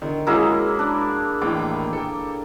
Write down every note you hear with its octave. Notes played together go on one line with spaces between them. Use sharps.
D3 D#3
G#3 A#3 C#4 E4 F#4 G#4
D4
D#2 A2 E3 D6
A4 G5